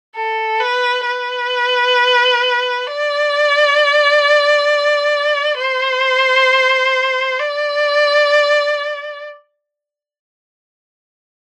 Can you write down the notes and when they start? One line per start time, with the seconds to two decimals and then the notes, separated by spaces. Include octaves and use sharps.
0.16 A4
0.60 B4
1.06 B4
2.87 D5
5.58 C5
7.40 D5